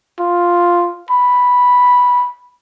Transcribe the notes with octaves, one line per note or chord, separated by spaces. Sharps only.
F4
B5